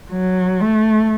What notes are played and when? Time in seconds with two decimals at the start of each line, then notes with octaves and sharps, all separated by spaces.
0.10 F#3
0.61 A3